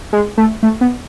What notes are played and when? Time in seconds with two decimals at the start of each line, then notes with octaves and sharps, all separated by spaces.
0.13 G#3
0.38 A3
0.63 A3
0.81 B3